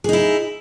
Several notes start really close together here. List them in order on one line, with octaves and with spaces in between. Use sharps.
G#4 D#4 E4